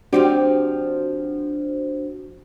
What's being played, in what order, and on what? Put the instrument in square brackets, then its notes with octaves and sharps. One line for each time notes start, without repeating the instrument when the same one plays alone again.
[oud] F3 C4 G4 [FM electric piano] D4 F#4 C5